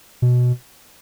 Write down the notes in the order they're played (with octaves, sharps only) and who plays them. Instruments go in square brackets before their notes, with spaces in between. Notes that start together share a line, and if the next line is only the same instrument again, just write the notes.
[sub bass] B2